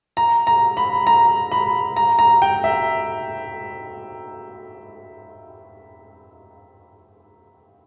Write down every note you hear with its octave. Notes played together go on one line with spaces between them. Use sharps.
A#5
A#5
B5
A#5
B5
A#5
A#5
G5
E5